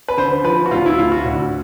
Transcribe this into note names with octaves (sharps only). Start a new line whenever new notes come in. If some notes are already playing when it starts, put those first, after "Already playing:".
B4
D3 C5
F3 B4
F#4
D2 F4
E4
D2 F4
F#4
D2